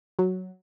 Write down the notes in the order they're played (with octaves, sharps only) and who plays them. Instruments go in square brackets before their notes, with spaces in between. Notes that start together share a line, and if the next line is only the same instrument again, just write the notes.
[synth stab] F#3